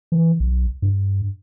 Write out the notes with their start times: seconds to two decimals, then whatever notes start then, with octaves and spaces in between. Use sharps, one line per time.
0.12 E3
0.40 B1
0.82 G2